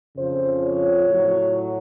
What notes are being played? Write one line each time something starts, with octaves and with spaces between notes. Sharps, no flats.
F2 C#3 F3 C5
C#5
A2 F#3